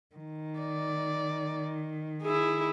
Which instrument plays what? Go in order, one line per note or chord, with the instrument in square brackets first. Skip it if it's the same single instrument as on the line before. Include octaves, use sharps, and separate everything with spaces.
[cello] D#3
[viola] D5
E4 G#4